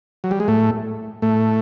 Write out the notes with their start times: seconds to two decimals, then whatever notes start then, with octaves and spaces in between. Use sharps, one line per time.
0.24 F#3
0.31 G3
0.40 G#3
0.48 A2 A3
1.22 A2 A3